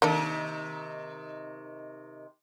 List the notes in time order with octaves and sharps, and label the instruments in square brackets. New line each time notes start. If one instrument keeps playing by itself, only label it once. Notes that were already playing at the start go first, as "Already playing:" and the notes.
[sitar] C3 D#3 [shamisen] A#3 D4 A4